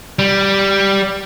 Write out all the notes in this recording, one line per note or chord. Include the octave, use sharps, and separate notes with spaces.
G3